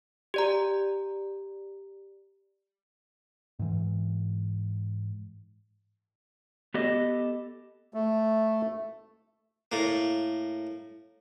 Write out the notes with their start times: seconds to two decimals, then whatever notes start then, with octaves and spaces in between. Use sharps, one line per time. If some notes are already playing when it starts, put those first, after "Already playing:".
0.34 G4 D5 A#5
3.59 G#2 E3
6.74 B3 G4 A4 D#5
7.94 A3
9.72 A2 A#3